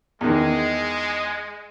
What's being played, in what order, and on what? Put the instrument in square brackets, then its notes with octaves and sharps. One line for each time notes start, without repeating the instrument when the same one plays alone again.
[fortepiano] E2 D#3 [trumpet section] G#3